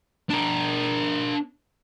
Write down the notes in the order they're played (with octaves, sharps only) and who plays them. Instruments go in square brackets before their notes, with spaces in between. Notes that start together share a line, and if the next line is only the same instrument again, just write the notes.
[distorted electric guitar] D4 A#4